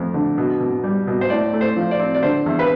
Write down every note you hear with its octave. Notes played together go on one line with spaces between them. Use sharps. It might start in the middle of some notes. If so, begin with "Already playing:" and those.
Already playing: F2 A3
D3
B2
B2
G3
B2
C5
A2 D5
A3
C5
F3
D5
C4
D5
D3 C5
E2
B4